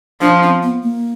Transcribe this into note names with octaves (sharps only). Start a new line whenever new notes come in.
F3 D4
C4
B3
A#3